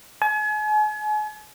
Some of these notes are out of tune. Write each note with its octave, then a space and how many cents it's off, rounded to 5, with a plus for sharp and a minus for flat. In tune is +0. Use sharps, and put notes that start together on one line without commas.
G#5 +40